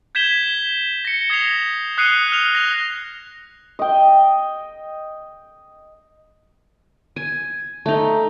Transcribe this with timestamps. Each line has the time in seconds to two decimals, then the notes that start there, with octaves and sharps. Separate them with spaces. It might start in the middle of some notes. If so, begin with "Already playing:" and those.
0.15 G6 G#6 B6 E7 G7
1.05 A#6 C#7
1.30 D#6 G#6 A#6 C7 F7
1.98 D#6 F#6 C7 C#7 D#7 G7
2.32 F6 F7
2.55 A#6
3.79 D#5 G5
7.16 G#5
7.86 A3 D#4